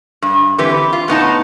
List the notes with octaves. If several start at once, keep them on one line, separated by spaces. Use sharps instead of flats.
G2
D3 E3 C4 G4 B4
F4
A2 B3 D#4 A5